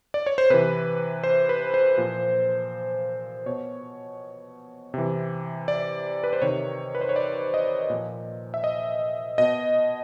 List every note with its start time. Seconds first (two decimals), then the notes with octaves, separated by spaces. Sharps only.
0.14 D5
0.26 C#5
0.38 C5
0.50 C3 E3 B4
1.24 C5
1.49 B4
1.74 C5
1.97 A#2 F3
3.46 B2 C#5
4.94 C3 E3
5.68 D5
6.24 B4
6.33 C5
6.42 C3 D#3 C#5
6.95 B4
7.01 C5
7.09 C#5
7.16 D5
7.54 D#5
7.90 A#2 F3
8.54 E5
8.64 D#5
9.38 B2 D#5